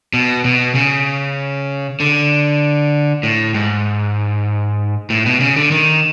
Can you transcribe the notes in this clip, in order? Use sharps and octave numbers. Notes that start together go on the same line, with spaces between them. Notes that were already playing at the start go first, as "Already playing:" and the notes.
B2
B2
C#3
D3
A2
G#2
A2
B2
C#3
D3
D#3